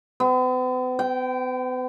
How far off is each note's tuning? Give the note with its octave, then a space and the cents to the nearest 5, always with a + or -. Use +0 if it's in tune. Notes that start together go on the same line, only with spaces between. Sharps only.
B3 +45
G5 -15